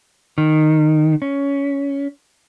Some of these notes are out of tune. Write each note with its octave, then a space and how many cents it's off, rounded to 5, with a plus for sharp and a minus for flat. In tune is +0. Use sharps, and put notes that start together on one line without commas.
D#3 -10
C#4 +15